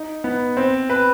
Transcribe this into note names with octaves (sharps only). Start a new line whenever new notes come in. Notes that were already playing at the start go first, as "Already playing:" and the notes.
Already playing: D#4
B3
C4
B4